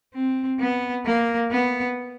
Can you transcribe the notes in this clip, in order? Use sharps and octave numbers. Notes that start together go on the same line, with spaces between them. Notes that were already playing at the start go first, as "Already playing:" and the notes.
C4
B3
A#3
B3